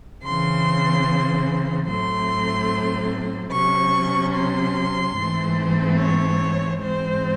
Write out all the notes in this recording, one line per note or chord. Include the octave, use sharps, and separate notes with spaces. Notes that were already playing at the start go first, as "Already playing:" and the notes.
C#3 E3 C4 C6
A2 F#3 A3 C4 C6
C3 F#3 C#4 C#6
C6
G#2 E3 A3 C4
C#5
G#2 E3 G#3 C4 C5